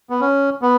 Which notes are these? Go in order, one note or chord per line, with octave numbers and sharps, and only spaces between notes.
B3
C#4
B3